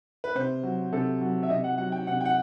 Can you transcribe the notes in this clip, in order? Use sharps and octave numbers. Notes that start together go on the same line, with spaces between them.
B4
C3 C5
F#3
C3 A4
F#3
E5
C3 D#5
F#5
F#3 F#5
G5
C3 F#5
G5
F#5